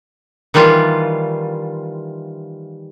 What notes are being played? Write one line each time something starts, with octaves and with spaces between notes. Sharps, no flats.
D#3 E3 G3 F4